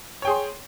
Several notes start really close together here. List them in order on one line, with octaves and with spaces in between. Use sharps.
C#5 G5 G#4 C6